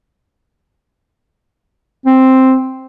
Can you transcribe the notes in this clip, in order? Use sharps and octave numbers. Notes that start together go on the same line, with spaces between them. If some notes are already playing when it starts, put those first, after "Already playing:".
C4